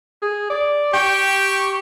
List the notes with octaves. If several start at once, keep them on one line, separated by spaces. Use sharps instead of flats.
G#4
D5
G4 G5 C#6